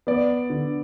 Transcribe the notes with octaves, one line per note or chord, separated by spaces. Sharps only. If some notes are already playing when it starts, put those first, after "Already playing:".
B3 D5
D3